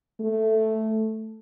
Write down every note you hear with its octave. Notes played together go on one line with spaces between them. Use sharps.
A3